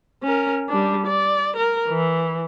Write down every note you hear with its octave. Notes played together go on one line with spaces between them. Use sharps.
C#4 A#4
G3 D4
D5
A#4
E3